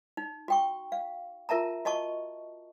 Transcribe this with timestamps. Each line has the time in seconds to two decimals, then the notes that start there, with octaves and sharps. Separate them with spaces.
0.17 D#4
0.48 F#4 G5 C#6
0.92 F5
1.49 F4 A#4 E5 A5 A#5
1.85 F#4 D#5 A5 C#6